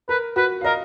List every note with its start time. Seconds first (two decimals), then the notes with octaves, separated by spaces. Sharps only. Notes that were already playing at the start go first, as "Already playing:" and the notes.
0.09 A#4 B4
0.36 F#4 B4
0.61 F5
0.64 A#4 D#5